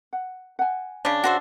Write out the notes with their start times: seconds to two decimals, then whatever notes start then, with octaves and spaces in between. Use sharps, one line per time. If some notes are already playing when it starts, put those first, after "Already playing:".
0.13 F#5
0.59 F#5 G#5
1.05 C#3 D4
1.24 F#4 C5 E5